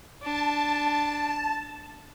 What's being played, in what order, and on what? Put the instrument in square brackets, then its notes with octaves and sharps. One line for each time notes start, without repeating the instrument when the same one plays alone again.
[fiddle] D4 [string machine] A5